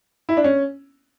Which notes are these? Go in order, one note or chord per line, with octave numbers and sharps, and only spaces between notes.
E4
D4
C#4